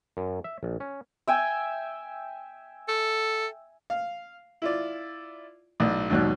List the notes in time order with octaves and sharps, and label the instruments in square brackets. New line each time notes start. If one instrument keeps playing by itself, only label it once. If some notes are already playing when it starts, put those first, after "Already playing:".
[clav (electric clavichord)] F#2
E5
A#1
C#4
[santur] E5 G5 G#5
[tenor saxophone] A4
[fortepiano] F5
E4 F4 D5
B1 A2 F#4 D5
D#2 G#2 B2 F#3 D5 F#6